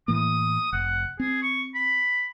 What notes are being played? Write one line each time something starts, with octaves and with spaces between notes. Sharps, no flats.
A2 E3 A#3 D#6
F1 F#5
C4 G#4
C#6
B5